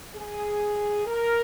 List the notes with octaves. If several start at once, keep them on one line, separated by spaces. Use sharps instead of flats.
G#4
A#4